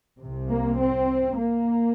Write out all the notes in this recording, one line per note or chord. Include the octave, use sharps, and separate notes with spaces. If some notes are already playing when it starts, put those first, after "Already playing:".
C2 C3
A#3
C4
A#3